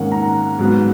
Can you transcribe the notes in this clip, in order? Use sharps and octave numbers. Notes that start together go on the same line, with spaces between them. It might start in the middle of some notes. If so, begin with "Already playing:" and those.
Already playing: G#2 D#3 A#3 C#4 F#5
A#5
G#2 F#3 B3